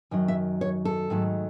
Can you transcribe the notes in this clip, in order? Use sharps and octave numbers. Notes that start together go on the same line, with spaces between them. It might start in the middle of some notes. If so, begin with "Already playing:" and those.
F#2 D#3 F#3
E5
C#5
A4
G#2 D#3 F#3 A3